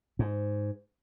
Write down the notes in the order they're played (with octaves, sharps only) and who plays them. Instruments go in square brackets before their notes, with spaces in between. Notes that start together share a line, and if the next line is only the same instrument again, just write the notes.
[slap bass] G#2